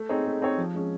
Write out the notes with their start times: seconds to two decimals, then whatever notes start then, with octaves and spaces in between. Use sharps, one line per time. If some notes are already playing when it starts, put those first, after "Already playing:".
Already playing: A3
0.09 C4 D#4 G#4 C#5
0.25 A3
0.42 C4 D#4 G#4 C#5
0.58 F3
0.74 G#3 C#4